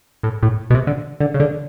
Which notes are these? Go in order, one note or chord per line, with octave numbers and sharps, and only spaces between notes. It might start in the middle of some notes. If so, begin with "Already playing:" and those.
A2
A2
B2
C3
D3
D3
C#3
D3